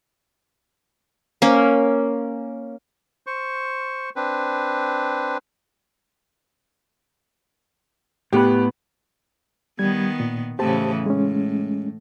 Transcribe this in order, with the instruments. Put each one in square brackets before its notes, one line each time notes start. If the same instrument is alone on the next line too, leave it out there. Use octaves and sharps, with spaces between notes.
[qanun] A#3 C#4
[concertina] C5 C#6
C4 D4 B4
[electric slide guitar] A2 B3 B4 [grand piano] G4
[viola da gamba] D#3 B3 [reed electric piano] G3 G#6
[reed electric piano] A#2
[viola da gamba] A2 C#3 E3 [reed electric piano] G4 C5 A5
[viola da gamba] A2 [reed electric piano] G#3 C#4